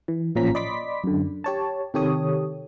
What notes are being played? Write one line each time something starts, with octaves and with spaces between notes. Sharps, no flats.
E3
A1 A#2 F3 C#4 A#5 B6
D5 D#5 B5 C6 D6 B6
F#2 D3
G4 C#5 A5
C3 D#3 G4 A4 C#5 D#6